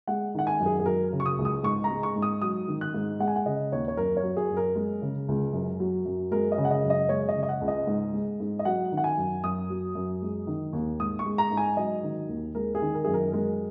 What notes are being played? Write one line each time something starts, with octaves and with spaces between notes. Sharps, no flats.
G#3 F#5
D#3 F#5
G#5
F#2
G#4
G#4
F#3 A#4
C#3
C#6
D#6
C#2
D#6
G#2 C#6
A#5
G#3
C#6
G#2
D#6
F#3 D#6
D#3
F#6
G#2
G#3 F#5
G#5
F#5
C#3 D#5
D#2 C#5
C#5
F#2 A#4
C#5
F#3
G#4
F#2
A#4
G#3
C#3
C#2
F#2
F#3
F#2
G#3 A#4
D#5
C#3
F#5
D#5
F#2
D#5
G#3 C#5
D#5
C#3
D#5
F#5
C#2
D#5
G#2
G#3
G#2
D#5
F#3 F#5
D#3
F#5
G#5
F#2
F#2 D#6
F#3
F#2
G#3
D#3
D#2
G#2 D#6
C#6
G#3
A#5
G#2
G#5
F#3 D#5
D#3
D#2
G#3 A#4
G#4
D#3
A#4
F#2 G#4
A#4
G#3 A#4